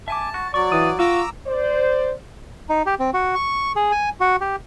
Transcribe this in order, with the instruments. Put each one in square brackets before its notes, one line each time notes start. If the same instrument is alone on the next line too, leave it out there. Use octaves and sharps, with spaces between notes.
[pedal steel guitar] E5 G#5 D6 [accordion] A5
[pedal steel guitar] F#4
[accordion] F#3 D5 [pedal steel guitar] C#6
[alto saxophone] E3 [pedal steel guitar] F5 D#6
[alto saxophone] F4 [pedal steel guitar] F#4 [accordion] A#5 D6 E6
[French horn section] C5 D5
[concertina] D#4
G4
C4
F#4
C#6
G#4
G#5
F#4
G4